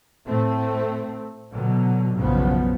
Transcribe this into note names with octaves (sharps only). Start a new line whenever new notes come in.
A2 A3 C4
B2 D3 F#3
F#1 B1 C#3 F3 G3 B3